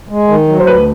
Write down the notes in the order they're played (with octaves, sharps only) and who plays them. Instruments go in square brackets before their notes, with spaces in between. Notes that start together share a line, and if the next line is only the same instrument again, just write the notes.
[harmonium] G#3
D#3
F#3
[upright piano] C5
[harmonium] D2 [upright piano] B4